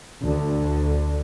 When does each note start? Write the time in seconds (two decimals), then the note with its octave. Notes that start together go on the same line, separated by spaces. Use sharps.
0.23 D2 D3